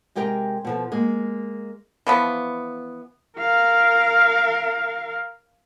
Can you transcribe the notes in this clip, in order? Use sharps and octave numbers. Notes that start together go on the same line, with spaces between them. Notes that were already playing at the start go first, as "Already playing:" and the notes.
C3 G#3 G4 A#4 G5
B2 F3 A4
G#3 A#3
E3 F3 B3
A#4 F5